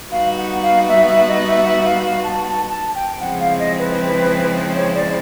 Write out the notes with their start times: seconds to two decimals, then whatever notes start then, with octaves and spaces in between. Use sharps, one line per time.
0.11 G3 B3 D#4 F#4 B4 F5
0.37 F#5
0.62 F5
0.88 E5
1.08 E5
1.28 D#5
1.47 E5
1.66 E5
1.85 F5
2.05 F5
2.24 A5
2.43 A5
2.69 A5
2.95 G5
3.20 C#3 F3 G#3 C4 E4 F#5
3.40 F5
3.59 D#5
3.79 B4
4.75 C#5
4.95 D5